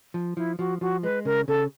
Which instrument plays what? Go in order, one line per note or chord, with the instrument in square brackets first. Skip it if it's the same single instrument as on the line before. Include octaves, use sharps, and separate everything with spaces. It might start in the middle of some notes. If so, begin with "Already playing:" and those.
[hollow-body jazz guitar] F3
[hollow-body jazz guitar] F3 [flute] E4
[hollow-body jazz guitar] F3 [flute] F#4
[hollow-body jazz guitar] F3 [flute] F#4
[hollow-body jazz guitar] G#3 [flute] B4
[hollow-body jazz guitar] C#3 [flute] A#4
[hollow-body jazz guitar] C#3 [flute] A4